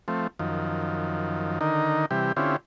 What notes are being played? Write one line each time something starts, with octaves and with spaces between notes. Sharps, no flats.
F3 A3 C4
F#2 D#3 F3
D3 D#3 D#4 A#4
C3 E3 G3 G4
D3 C4 C#4 E4 F4 G4